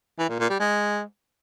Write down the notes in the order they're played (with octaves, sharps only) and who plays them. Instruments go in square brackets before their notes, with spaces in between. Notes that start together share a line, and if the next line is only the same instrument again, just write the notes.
[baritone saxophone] E3
A#2
A#2
G3
G#3